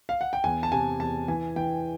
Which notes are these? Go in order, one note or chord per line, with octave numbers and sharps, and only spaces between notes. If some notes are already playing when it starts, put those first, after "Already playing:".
F5
F#5
G5
E2 G#5
A5
C3 G#5
E2 A5
E3 G#5
E3 G5